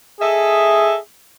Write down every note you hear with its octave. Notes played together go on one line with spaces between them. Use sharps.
G#4 A4 D#5 E5